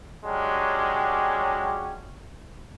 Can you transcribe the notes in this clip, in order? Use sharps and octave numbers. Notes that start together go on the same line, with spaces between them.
F#3 G#3 C#4 D4 G4